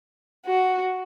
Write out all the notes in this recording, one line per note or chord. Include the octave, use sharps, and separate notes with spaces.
F#4